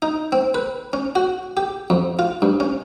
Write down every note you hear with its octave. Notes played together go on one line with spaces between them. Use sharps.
D#4
C4
B4
C#4
F#4
G4
F2
F4
G2
C#4